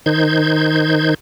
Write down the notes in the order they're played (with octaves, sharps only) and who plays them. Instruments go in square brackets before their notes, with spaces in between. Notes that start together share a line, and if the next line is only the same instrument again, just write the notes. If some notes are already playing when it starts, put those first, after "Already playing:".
[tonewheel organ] D#3 D#4 C5 G6 G#6